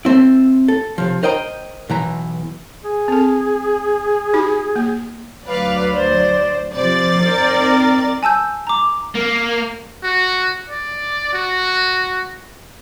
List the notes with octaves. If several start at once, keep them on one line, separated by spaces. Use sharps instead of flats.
A3 C4 E4
A4
C3 F3
A#4 C5 D#5 G5 A5 A#5
B1 E3 A#5
G#4
C4 A4
D#4 F#4 G4
A#3
D2 F#3 B4 D5 F5
C5 D5
C3 F3 C5 D5 A6
C4 D#4 A#4
G#5 A5 E6 G6
A#5 D6
A#3
F#4
D5
F#4